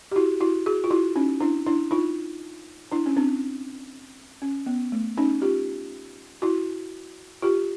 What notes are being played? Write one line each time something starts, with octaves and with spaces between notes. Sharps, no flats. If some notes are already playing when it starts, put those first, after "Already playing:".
G4
E4 F#4
E4 F#4
F#4 G#4
F4
E4 F#4
C#4 D#4
D4 E4
D4 E4
D#4 F4
D4 E4
C#4
C4 D4
C#4
B3
A3
C#4 D#4
F4 G4
E4 F#4
F4 G4